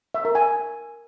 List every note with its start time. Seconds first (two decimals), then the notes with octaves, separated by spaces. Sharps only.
0.14 E5
0.25 A#4
0.35 G#5